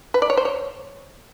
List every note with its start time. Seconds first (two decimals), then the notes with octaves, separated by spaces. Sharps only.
0.14 B4
0.22 D5
0.30 C#5
0.37 C5
0.45 C#5